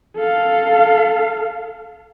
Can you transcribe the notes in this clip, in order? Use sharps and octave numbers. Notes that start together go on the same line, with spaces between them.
A4 F5